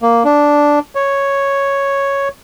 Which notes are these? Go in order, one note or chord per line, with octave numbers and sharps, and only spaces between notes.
A#3
D4
C#5